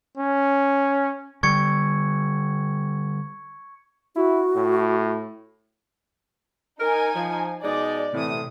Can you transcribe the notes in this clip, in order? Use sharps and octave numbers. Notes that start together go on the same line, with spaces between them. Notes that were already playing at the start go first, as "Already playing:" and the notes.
C#4
D3 G3 C#6 G#6 C#7
E4 F#4
A2
D#4 A#4 G#5
F3
B2 G#3 D#4 D5
A2 C3 E3 D#6